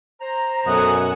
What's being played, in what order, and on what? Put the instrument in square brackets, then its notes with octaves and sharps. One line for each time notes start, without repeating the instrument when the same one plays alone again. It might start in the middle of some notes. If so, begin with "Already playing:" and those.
[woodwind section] C5 A#5
[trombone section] F#2 B2 [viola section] A4 F#5 G#5 [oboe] D#5